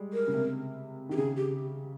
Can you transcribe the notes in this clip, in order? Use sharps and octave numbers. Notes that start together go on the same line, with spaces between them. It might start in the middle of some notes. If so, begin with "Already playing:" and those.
Already playing: G3 G#3
A#4
C#3
C3
D#3 G4
C#3 G#4
G4